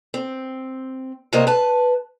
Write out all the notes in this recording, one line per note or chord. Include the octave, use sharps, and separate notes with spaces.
C4
C3 G3 A#3 C5 C#5 D#5
B4 A5